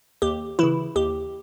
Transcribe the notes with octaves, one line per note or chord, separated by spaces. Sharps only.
D#2 G4
C#3 E3 E4
D#2 G4